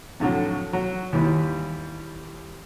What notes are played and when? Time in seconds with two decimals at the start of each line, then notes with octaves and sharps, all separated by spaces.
0.20 F2 A2 D3 F#3
0.73 F#3
1.13 D#2 E3 G3